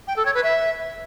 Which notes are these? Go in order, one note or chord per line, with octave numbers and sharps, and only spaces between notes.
G5
A4
C#5
B4
E5